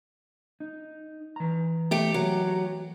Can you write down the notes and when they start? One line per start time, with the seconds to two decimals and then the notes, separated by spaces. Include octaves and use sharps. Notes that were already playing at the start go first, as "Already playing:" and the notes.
0.60 D#4
1.36 E3 A#5
1.91 A3 G4
2.14 F#3